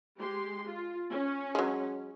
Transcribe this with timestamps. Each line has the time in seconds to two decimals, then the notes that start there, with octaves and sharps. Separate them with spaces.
0.18 G#3 G4 C6
0.67 F4
1.10 C#4
1.55 F#3 G#3